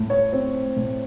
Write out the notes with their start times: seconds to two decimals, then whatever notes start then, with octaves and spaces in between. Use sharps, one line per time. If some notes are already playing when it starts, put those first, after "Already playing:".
Already playing: A2
0.10 C#5
0.33 C4
0.76 A2